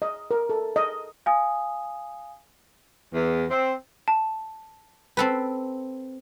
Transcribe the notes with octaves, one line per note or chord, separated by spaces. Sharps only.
D#5
A#4
A4
D#5
F5 G#5 D#6
E2
C4
A5
C4 A4 B4